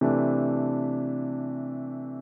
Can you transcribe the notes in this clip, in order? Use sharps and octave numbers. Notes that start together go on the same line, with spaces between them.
C3 E3 A3 D4